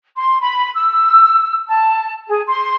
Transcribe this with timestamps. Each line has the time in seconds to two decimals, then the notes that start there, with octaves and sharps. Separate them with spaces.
0.16 C6
0.40 B5
0.75 E6
1.67 A5
2.28 G#4
2.46 C6